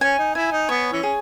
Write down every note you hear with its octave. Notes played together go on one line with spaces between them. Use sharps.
C#4 G#5
D#4
E4 G#5
D#4
B3 C#5
E3 C#4
G#4